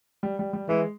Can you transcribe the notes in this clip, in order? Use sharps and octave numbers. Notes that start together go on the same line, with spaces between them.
G3
G3
G3
E3 G#3